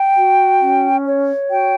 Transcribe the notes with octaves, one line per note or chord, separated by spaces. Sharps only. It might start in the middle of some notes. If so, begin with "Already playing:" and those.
Already playing: G5
F#4
C#4
C#5
F#4 G5